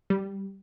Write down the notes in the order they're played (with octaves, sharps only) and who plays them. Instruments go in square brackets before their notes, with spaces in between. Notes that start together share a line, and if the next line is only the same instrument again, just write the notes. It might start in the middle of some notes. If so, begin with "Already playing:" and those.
[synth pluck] G3